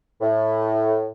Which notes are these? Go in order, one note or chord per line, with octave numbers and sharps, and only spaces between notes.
A2